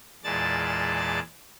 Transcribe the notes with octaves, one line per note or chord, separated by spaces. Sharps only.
E2 A#2 G#3 D5 A5 A6